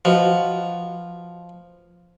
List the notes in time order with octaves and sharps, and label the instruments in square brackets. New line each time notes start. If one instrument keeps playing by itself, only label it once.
[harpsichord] F3 [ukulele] F#4 B4 D#5